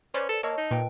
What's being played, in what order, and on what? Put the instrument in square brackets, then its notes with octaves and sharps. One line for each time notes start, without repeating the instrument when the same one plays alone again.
[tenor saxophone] C#4 [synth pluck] B4 C5 D5
[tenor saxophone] A4
[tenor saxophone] A#3 [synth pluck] C#5 [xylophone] D#5 A5 E6
[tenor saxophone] D#4
[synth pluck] A#2 [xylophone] B4 G5